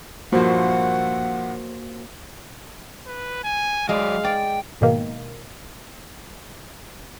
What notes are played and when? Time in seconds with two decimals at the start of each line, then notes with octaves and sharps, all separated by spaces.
0.32 G2 A#2 F3 A#3 F#4 C5 F#5
3.07 B4
3.44 G#5
3.89 F#3 G#3 D5 F5
4.25 D5 G5
4.81 G#2 B2 D#3 A#3